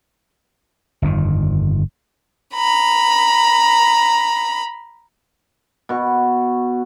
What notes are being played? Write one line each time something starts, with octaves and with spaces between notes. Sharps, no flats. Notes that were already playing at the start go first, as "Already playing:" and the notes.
G1 F2 D#3
A#5 B5
B2 C#6